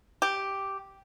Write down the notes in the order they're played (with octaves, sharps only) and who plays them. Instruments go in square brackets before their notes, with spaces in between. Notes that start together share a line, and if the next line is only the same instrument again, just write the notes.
[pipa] G4